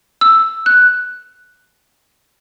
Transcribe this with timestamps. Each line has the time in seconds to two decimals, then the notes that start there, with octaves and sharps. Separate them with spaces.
0.21 E6
0.66 F#6